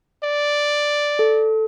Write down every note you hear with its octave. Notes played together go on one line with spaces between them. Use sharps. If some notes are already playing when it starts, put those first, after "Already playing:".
D5
A4